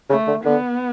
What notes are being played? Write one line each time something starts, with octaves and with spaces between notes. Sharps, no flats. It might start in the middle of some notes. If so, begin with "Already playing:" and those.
C#3 A3
D3
D3 B3